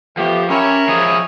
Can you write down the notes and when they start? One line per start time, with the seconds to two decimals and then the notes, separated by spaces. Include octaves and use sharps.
0.17 F3 A3 B3 G4
0.50 C#4 E4 G4 A#4 C#5
0.88 F3 G#4 D#5 D#6